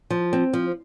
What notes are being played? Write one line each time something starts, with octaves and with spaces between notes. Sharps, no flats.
F3
C4
F3